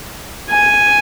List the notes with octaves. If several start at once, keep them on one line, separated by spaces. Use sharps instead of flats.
G#5